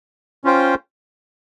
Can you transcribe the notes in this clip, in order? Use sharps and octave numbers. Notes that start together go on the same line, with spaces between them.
C#4 F4 C5 G5